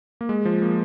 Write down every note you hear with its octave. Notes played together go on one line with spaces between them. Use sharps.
A#3
G#3
F3
A#3